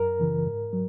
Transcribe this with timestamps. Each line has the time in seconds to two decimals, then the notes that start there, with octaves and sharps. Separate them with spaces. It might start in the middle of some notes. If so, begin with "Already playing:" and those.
Already playing: F#2 A#4
0.20 C#3 E3
0.46 G#2
0.73 F#3